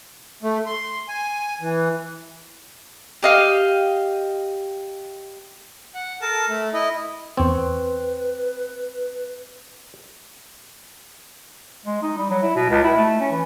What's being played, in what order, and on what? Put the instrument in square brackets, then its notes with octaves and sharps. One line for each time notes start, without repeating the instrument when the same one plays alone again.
[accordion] A3
C6
G#5
E3
[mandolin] G4 D#5 F5
[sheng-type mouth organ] F#5
A4 A#4 A5
A3
E4 D#5
[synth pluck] E2 C#6 G#6 [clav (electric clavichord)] C4 [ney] B4
[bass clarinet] G#3
D#4
G3
F#3
E4
B2
C#2
E4
A3
C#4
E3